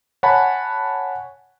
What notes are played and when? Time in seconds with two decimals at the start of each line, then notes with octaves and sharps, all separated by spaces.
0.23 C#5 F#5 G#5 A5 B5